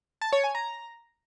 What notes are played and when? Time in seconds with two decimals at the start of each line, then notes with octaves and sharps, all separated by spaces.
0.21 A5
0.33 C#5
0.44 G#5
0.55 A#5